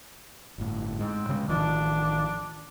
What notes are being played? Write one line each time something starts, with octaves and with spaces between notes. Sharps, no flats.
G1 A2
G#2 C4
C#3 F#3 G#3
A1 D#3 F3 D4